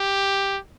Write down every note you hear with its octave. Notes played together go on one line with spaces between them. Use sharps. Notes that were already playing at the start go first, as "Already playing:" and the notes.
Already playing: G4